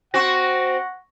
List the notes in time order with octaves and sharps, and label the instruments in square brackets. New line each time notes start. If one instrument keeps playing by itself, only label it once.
[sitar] C4 F#4 [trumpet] F#5 [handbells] C#6 A#6